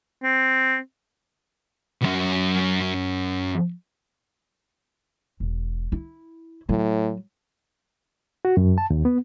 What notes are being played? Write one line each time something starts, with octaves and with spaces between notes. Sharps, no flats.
C4
B1 F#2
E1
E4
A2 F#3
F#4
F#2
A5
D#2
B3